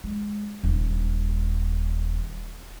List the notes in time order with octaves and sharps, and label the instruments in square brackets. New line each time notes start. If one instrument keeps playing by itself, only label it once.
[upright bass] G#3
D#1 D#2